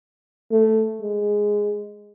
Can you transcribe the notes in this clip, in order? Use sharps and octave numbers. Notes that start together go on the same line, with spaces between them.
A3
G#3